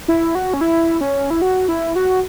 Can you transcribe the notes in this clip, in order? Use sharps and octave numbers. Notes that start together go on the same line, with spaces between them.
E4
F#4
C#4
E4
C#4
E4
F#4
E4
F#4